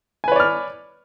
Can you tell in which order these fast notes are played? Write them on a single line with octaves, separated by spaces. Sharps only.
G#5 B4 C#5 D5 F6